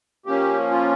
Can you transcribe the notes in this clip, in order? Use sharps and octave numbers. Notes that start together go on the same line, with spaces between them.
F3 A#3 C#4 G4
F4